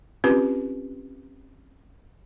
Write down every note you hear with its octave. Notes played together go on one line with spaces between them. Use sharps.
C4 C#4 F4 G4 B4